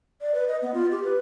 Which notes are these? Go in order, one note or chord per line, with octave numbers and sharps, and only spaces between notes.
D5
B4
D#5
B3
F4
G4
B4